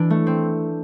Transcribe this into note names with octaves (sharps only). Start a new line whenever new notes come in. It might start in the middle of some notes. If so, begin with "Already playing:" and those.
Already playing: E3 D4
A3
C4